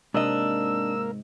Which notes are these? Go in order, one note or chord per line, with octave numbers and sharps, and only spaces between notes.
G#2 C3 A#3 D4 A#4 D#5 E6